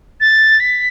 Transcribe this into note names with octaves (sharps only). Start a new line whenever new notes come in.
A6
B6